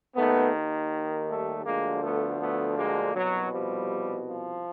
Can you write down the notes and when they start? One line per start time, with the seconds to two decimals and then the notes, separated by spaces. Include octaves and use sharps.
0.16 D#2 D#3 A3 B3
1.29 G3 A3
1.65 D2 D3 F3 G#3 A#3
2.03 A3 B3
2.40 A3 B3
2.78 G#3 A#3
3.15 C2 B2 F#3
3.52 F3 G3
4.27 F3